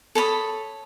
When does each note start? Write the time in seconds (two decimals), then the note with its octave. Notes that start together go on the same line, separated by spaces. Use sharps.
0.15 A4 C#5 B5 D#6